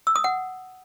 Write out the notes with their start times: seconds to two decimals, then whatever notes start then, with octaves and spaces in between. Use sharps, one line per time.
0.07 E6
0.16 D#6
0.24 F#5